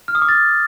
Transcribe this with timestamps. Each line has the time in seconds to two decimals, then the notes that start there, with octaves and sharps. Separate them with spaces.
0.08 F6
0.15 D#6
0.22 D6
0.29 A6